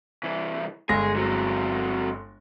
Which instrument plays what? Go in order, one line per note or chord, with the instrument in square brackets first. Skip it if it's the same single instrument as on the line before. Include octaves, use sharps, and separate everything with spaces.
[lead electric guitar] C2 E3
[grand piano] G1 G#3 A#6 [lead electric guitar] G#4
[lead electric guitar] F#3 C4